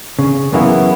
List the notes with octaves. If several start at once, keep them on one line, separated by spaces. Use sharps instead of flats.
C#3
F#2 C#3 E3 A#3 B3 E4